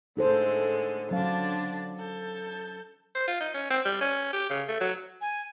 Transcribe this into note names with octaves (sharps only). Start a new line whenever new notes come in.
A2 D3 G#3 D#4 A4 C5
D3 F#3 C#4 D4 F5 A5
A4 G6
C5
F4
D#4
C#4
C4
G3
C#4
G4
C#3
A3
F#3
G#5